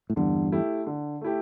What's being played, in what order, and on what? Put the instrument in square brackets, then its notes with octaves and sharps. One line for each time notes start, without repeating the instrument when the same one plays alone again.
[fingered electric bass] A2
[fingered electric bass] E2 G2 [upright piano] D3
[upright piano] A3 E4 G4
D3
A3 E4 G4